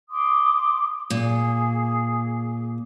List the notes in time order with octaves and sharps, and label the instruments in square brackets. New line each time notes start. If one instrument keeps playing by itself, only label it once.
[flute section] C6 D6 D#6
[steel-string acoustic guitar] A#2 [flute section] G#4